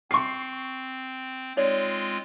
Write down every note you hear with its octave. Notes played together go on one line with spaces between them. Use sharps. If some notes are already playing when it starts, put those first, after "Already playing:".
C4 C#6 C7
G#3 C4 D#4 F4 C#5 D5